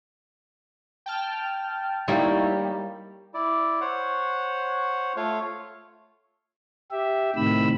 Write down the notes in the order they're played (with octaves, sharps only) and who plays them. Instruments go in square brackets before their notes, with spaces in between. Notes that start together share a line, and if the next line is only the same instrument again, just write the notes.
[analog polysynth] G5 A5 F6
[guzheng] G3 A#3 G4 [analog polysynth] D#4 E4 C#5
[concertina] E4 D5
C5 C#5 F#5
A3 F4 C#5 F5
[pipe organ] G4 E5
A2 C3 D#3 B5 E6